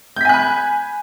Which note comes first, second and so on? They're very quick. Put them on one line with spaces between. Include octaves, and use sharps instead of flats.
G6 B6 G#5 F#6 B5